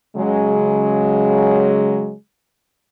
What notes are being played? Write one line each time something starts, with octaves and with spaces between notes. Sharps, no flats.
C#3 F#3 G#3